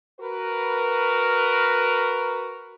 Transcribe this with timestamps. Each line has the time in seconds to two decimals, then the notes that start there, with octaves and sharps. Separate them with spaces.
0.20 F#4 A#4 B4